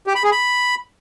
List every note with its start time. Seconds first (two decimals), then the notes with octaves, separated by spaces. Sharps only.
0.07 G4
0.15 B5
0.24 G#4
0.32 B5